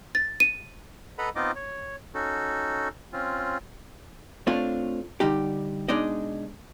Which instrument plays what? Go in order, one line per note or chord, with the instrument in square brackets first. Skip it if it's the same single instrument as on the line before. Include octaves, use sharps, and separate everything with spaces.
[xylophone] A6
D#7
[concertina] A4 B4 D#5 F#5 A#5 B5
B3 C4 D#4 F4 D#5 D6
C#5
C#4 D#4 F#4 A4
C4 C#4 F4
[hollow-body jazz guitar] A3 C4 D4 F4 C#5
D3 G3 D#4 G4
B2 G#3 D4 D#4 D5 D#5